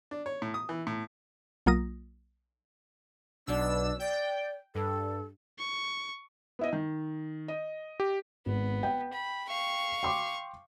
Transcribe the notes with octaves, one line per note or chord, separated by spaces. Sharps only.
D4
C#5
A2
D#6
E3
A2
B1 F#3 A#3 F4 D#6 A#6
B1 B2 D4 E6
D5 G5
G2 A4
C#6
B3 E4 D#5
D#3
D#5
G4
G#1 B3
G5
B5
F5 C#6
G5 C6 D6